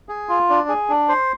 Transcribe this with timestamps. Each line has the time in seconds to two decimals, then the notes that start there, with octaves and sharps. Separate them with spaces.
0.09 G#4
0.29 F4
0.50 D4
0.69 G#4
0.89 D4
1.09 C5